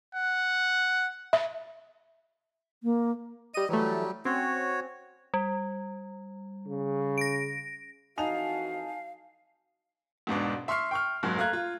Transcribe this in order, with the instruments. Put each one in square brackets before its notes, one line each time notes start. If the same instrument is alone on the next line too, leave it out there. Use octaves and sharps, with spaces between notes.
[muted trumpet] F#5
[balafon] E5
[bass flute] A#3
[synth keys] G3 D#7 [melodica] D#5
[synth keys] E3 A3 [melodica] F#3 G3
[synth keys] C4 C#4 [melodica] F#4 C#5
[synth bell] G3
[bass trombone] C#3
[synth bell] A#6 D7
[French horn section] F2 E3 F#4 [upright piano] D#4 F7 [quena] F5 [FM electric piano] G#5 A5
[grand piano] E1 G#2 B2 D4
E5 C6 C#6 F6 C7
G5 C#6 F6
F#1 G#2 F#3
A3 F5 A#5 F#6 G#6
F4